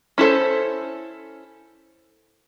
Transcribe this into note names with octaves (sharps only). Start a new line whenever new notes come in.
C#4 E4 A4 C5